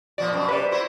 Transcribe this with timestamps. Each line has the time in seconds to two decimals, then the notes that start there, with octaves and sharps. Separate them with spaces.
0.18 A#2 F3 F#4 D5
0.32 F#2 B2 C4
0.48 C3 B4 D5
0.71 E4 F#4 C5